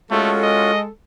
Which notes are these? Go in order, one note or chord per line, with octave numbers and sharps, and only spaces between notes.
G#3 A3 C#4 F4 F#4 A4
D#5